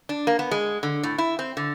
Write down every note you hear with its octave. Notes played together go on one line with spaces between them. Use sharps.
D4
A#3
B3
G#3
D3
A2
E4
C4
D3